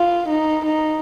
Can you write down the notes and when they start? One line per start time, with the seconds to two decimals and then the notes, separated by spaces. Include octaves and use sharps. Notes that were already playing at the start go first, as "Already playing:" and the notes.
Already playing: F4
0.28 D#4
0.65 D#4